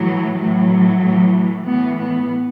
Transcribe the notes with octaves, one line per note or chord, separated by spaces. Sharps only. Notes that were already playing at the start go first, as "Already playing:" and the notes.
Already playing: A2 E3 F#3
A2 E3 F#3
A2 E3
A2 E3 B3
B3